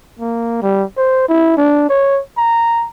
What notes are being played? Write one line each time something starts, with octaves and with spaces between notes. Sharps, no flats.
A#3
G3
C5
E4
D4
C#5
A#5